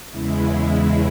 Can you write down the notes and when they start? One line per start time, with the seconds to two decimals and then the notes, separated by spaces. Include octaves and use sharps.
0.10 E2 C#3 G#3 E4